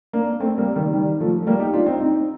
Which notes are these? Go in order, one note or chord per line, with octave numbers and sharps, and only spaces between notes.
A#3 D4
A3 C4
G3 A#3
D#3 G3
D#3 G3
F3 A3
A3
G3 A#3
D#4 G4
D4 F4
C4 D#4
C4 D#4